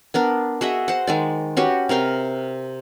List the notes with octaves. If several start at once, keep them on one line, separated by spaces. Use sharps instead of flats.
B3 D4 A#4
F#4 G#4 D#5 E5
C5 F#5
D#3 G#3 D5
C#4 F#4 G4 B4
C3 A#4 F5 G5